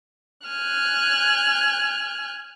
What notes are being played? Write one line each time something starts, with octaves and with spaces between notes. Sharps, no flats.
G#5 F6 F#6